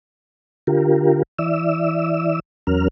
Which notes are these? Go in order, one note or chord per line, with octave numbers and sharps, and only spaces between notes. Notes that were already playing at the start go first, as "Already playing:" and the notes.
D3 F4 G4 A#4
E3 D5 E5 E6
E2 F#3 C#4 A#4 F6